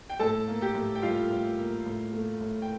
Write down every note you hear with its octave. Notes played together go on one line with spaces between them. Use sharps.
G5
A2 A4 A5
A#3
G4 G5
A2
G5
G3 F4 F5
A2
A#3
A2
A3
A2
G5